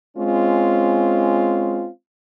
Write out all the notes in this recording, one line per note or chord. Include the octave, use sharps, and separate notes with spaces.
G#3 C4 C#4 F4